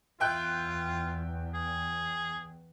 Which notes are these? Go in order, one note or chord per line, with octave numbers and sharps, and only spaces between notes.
E2 F4 E5 G5 F#6
G#4